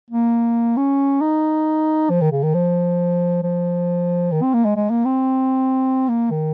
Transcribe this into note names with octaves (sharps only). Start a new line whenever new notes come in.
A#3
C#4
D#4
F3
D#3
C#3
D#3
F3
F3
D#3
C4
A#3
G#3
G#3
A#3
C4
A#3
D#3